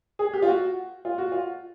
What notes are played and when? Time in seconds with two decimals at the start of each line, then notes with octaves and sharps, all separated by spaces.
0.19 G#4
0.34 G4
0.42 F4
0.48 F#4
1.05 F4
1.18 F#4
1.32 F4